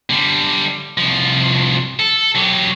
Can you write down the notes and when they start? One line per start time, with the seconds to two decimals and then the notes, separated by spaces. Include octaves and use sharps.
0.10 D3 G3
0.98 C2 F3
2.00 A4
2.35 F#3 G4